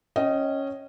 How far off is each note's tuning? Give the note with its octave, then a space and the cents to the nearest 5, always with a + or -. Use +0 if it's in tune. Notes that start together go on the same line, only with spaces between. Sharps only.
C#4 -10 D#5 +0 G5 -35